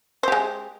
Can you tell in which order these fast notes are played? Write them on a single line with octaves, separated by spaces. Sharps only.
C5 G4 G#3